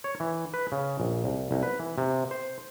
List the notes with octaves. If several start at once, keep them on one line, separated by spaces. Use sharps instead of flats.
C#5
E3
B4
C#3
A#1
C2
C2
B4
E3
C3
C5